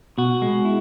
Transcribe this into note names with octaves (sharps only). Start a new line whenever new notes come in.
B2 F#4
G#3
E4